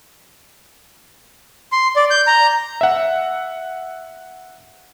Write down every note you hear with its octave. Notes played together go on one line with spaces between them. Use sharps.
C6
D5
G6
A#5
E5 F#5